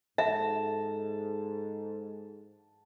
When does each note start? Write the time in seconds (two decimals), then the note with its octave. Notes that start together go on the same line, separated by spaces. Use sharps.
0.18 G#2 A4 E5 A5